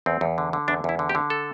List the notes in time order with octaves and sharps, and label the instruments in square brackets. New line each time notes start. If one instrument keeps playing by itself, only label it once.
[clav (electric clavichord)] E2 C4
E2
D3
D3
E2 D4
E2 E4
D3
G4
D3
A4